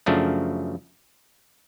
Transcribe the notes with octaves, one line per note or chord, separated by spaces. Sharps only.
F#2 C#3 F3 A3 D4